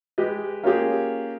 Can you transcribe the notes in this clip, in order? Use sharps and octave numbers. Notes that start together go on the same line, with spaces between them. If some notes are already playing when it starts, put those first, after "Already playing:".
G#3 G4 B4 D#5
A#3 C#4 F4 G4 G#4